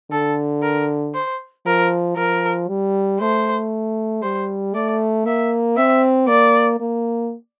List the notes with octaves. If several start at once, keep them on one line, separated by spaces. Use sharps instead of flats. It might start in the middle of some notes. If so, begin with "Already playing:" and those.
D3 A4
A#4
C5
F3 A#4
F3 A#4
G3
A3 C5
G3 C5
A3 D5
A#3 E5
C4 E5
A#3 D5
A#3